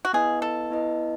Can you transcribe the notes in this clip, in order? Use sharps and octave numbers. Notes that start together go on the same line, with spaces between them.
F#4
B3 E4 G#4 B4 D#5
A4
B3 E4 B4 D#5